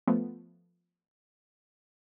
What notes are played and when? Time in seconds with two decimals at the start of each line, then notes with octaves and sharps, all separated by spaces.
0.07 F3 A3 B3